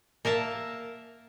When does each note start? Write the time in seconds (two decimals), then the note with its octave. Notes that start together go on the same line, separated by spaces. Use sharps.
0.25 A#3 A#4 E5 A5